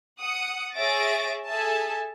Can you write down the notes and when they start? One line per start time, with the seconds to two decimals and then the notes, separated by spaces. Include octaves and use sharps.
0.19 F#5 D#6 C#7
0.75 G#4 C#5 E5 A6 A#6 D7
1.47 G#4 A4 E5 G#5 A5